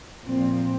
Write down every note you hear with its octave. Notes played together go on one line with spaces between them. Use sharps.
A#2 F3 C4